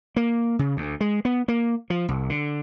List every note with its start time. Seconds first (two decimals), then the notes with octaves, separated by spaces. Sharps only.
0.16 A#3
0.59 C#3
0.77 D2
1.01 G#3
1.25 B3
1.48 A#3
1.90 F3
2.08 C2
2.30 D3